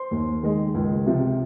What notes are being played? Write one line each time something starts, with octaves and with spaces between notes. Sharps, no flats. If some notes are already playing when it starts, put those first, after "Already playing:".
Already playing: C5 C6
D#2
D#3 G#3
C#2
C3 F3